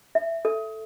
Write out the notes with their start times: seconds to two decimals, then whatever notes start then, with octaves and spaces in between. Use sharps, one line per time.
0.15 E5
0.45 A4